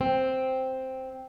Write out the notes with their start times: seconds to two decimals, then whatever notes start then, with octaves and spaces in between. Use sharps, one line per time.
0.01 C4